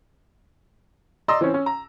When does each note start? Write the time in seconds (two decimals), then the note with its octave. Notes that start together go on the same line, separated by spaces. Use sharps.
1.28 D5 D#5 A#5 C6 E6
1.41 E3 C4 C#4
1.54 C#4
1.66 A#5